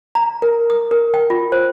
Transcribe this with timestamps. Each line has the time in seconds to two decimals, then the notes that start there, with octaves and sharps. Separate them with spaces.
0.15 A#5
0.42 A#4
0.70 D#6
0.91 A#4
1.14 G5
1.30 F4
1.52 C5